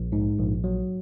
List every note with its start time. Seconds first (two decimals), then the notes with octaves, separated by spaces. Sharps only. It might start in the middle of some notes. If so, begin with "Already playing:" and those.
Already playing: A#1
0.12 G#2
0.38 A#1
0.64 F#3